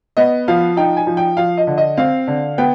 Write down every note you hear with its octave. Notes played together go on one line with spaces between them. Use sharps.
B3 D#5
F3 F5
D#4 G5
G#5
F3
G5
F3 F5
D#5
D3
D#5
C4 F5
D3
B3 G5